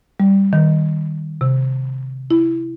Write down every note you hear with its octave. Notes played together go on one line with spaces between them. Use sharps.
G3
D#3
C3
E4